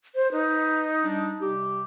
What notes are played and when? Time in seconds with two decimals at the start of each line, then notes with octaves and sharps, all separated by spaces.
0.15 C5
0.32 D#4 B4
1.04 G3 D4
1.41 C3 G3 G4